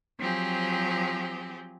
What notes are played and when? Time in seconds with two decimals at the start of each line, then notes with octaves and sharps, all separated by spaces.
0.19 F3 F#3 C4 G4 G#4